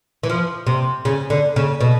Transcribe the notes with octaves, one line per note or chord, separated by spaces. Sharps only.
E3
F3
C3
C#3
D3
C#3
B2